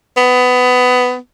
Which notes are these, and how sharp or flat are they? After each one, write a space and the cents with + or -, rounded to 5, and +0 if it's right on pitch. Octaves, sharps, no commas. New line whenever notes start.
B3 +20